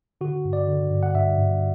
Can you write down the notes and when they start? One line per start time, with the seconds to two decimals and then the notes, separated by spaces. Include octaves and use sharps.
0.21 D3 F#4
0.45 G2
0.53 D5
0.68 D3
0.91 G2
1.03 F#5
1.15 G2 E5
1.39 G2